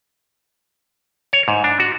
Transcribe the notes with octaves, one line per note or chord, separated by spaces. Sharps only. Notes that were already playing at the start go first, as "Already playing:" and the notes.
C#5
G#2
D4
F#4